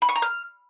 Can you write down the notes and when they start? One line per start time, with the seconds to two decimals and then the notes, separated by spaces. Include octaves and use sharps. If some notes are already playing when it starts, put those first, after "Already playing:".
0.02 B5
0.09 C#6
0.15 A#5
0.22 F6